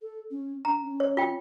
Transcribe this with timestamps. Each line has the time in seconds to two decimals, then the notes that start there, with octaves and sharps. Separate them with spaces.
0.02 A4
0.31 C#4
0.65 D4 A#5
0.83 C#4
1.00 C#5
1.17 F4 G5